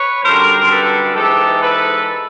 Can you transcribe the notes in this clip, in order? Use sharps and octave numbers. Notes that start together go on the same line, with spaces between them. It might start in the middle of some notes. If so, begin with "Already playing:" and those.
Already playing: B4 C#5
F#2 D3 G3 A#4 C5
A4 B4
G#2 E3 G#3 G4 A4
A4 B4